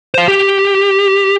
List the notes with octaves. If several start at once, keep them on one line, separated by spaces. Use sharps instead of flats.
C5 F5
G4